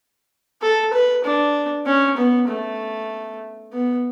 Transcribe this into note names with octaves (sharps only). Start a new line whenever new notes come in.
A4
B4
D4
C#4
B3
A3
B3